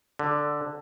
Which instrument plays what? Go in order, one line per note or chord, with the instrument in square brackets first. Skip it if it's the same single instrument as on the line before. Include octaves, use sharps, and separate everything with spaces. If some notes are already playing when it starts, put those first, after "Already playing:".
[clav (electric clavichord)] D3